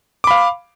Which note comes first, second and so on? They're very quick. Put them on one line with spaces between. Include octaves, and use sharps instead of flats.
D6 B5 F5